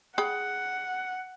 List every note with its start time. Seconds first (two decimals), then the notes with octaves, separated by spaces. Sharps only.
0.18 G#4 F#5 G5 B5